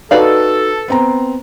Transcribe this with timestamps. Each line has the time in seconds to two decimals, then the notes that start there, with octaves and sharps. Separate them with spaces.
0.11 D#4 F#4 A4 B4 D5 F5
0.88 B3 C4 A#5